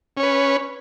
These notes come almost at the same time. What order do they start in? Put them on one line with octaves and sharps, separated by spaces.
C#4 C#5 B4